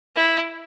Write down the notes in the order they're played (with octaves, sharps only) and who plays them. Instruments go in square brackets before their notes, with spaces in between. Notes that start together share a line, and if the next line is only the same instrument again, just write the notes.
[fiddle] E4